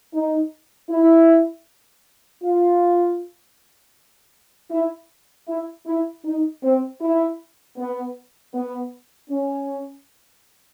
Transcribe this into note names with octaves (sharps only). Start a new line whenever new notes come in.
D#4
E4
F4
E4
E4
E4
D#4
C4
E4
B3
B3
C#4